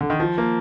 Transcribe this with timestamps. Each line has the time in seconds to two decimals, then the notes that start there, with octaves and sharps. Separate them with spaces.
0.01 D3
0.10 D#3
0.20 F3
0.38 A#3